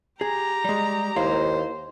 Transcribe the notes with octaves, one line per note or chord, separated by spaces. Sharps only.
G4 G#4 A#5
G3 G#3
D#2 E4 C5 F5